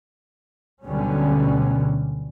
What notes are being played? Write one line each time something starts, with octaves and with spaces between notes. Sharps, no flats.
D2 B2 D3 F#3 G3 C#4